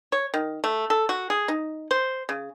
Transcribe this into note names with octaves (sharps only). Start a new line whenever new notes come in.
C#5
D#3
A3
A4
F#4
G#4
D#4
C5
C#3